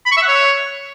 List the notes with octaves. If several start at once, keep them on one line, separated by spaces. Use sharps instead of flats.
B5
C#6
E5
F#5
C#5